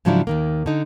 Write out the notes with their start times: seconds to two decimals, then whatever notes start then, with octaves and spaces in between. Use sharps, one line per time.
0.05 G#2 C#3 F3 F#3 D4 E4
0.27 D#2 D#3 A#3
0.66 D3 D#4